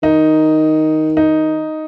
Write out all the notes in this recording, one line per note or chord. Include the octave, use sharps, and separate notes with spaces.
D#3 D#4
D#4